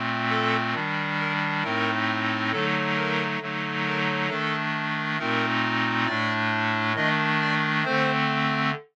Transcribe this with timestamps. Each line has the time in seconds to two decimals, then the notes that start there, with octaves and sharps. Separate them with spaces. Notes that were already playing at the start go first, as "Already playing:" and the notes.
Already playing: A#2 A3 C4
0.30 A4
0.74 D#3 G3 D4
1.19 A#4
1.63 A2 A3 C4 D#4 A#4
2.52 D3 F#3 A3 D#4 A4
2.97 A#4
3.41 D3 F#3 A3 D#4
3.85 A#4
4.29 D#3 A3 D4 A4
5.18 A#2 A3 C4 D#4 A#4
6.07 A2 A3 D4 D5
6.96 D#3 A3 D4 D#5
7.41 D5
7.85 D3 A3 C4 C5